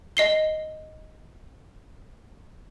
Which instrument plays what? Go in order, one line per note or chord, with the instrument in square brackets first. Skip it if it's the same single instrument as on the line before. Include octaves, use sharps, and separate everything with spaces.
[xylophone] D#5 C7 G7